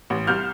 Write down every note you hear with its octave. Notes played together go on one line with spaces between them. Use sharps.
A1
C2 F6 G6